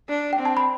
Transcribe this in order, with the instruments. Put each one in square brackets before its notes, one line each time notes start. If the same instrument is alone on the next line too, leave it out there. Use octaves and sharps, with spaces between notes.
[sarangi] D4
[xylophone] G5
[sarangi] C4
[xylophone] A5
B5